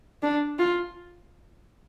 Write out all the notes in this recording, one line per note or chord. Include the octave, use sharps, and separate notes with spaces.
D4
F4